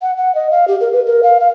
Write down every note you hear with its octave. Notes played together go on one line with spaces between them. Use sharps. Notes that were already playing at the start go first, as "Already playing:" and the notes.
F#5
F#5
D#5
F5
G4
A#4
B4
A#4
F5
F5